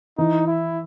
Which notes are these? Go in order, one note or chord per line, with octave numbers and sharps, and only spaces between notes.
E3 D#4
E4